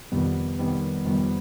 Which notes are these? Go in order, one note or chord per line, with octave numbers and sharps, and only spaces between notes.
F2 C3 D#3 G3 B3
F2 C3 D#3 G3 B3
F2 C3 D#3 G3 B3